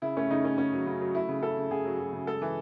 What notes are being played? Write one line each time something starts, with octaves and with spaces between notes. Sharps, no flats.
C#3 E4
A3 C#4
C#3 D#4
A3 C#4
C#3 C#4
F#3
C#3
F#3
A3 E4
C#3
C#3 A4
C#3
C#3 G#4
F#3
F#3
C#3
G#3 A4
E3